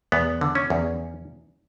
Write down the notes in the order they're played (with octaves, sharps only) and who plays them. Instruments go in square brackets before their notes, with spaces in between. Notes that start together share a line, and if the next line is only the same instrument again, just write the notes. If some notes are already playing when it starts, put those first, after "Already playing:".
[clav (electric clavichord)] E2 B3
D3
C#4
E2